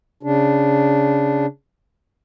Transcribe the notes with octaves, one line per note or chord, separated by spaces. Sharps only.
C#3 D4